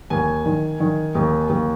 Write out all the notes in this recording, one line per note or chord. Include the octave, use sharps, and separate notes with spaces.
D#2 G#5
D#3
D#3
D#2
D#2